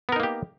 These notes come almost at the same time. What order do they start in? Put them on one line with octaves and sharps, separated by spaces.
B3 A#4 D#4 A#3 G4